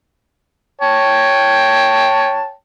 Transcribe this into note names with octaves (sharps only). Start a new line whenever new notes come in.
C#5 G5 A5